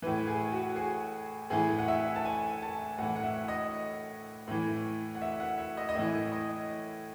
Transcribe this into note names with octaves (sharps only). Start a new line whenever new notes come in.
A2 E3 B4
G#4
F#4
G#4
A2 E3 G#4
F#5
E5
A5
G#5
A5
A2 E3 F#5
F#5
E5
D#5
A2 E3
F#5
E5
F#5
E5
D#5
D#5
A2 E3 E5
D#5